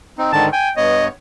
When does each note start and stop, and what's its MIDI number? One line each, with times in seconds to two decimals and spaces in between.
0.18 0.32 60
0.18 0.32 63
0.33 0.49 44
0.33 0.49 50
0.33 0.49 51
0.33 0.45 81
0.53 0.71 79
0.53 0.69 80
0.77 1.08 43
0.77 1.08 59
0.77 1.08 73
0.77 1.05 75